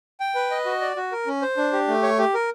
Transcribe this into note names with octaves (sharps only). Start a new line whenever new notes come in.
G5
B4
D#5
F#4
D5
F#4
A#4
C#4
C5
D4
G4
A3
C#5
G4
A#4